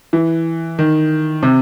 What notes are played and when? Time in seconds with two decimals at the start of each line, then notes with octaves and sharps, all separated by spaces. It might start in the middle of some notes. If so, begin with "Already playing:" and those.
0.13 E3
0.79 D#3
1.43 C3